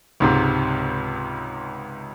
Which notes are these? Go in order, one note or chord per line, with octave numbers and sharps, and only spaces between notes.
C#2 G#2 C3